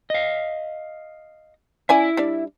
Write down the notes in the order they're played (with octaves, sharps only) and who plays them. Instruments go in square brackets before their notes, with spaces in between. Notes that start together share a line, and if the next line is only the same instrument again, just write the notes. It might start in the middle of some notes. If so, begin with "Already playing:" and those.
[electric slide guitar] D#5 F5
[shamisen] C#4 D5 G#5 [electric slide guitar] E4 E5
[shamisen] G3 D4 D5